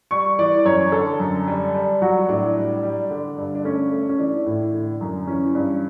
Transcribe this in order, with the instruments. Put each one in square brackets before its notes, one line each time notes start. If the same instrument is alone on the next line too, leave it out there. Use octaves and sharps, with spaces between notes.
[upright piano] G3 C#6
E3 D5
F#2 C#5
D3 A4
F#2
G3
G3
F#3 F#4
A2 D4
G3
G3
D3
G2
D4
A3 C#4
A3
C#4
E3 D4
A2
D3
F#2
E3 C#4
G2